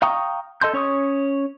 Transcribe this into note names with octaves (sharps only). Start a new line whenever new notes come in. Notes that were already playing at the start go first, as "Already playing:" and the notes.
F5 G5 A#5 C#6 D#6
A4 D#5 A5 C6 G6
C#4 C#5 C#6 D#6